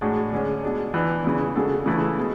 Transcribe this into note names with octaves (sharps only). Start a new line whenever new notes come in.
A2 G#3 D4 F#4
D3 G#3 C#4
B2 G#3 D4
E3 B3 D4
E2 C#3 E3
C#3 G#3 D4 F#4 A4
C#3 E3 A3 E4 A4
B2 G#3